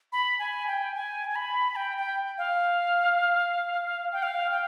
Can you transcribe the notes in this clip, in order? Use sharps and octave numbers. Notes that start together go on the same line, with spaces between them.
B5
G#5
G5
G#5
G#5
B5
G5
G5
F5
G5
F5
G5